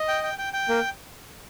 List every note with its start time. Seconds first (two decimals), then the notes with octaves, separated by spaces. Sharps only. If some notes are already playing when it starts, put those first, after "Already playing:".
Already playing: D#5
0.08 G5
0.23 G5
0.38 G5
0.53 G5
0.69 A#3